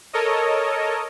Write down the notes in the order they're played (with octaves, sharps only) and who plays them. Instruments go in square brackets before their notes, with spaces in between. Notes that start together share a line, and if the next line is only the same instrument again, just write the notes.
[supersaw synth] A4 A#4 C#5 D#5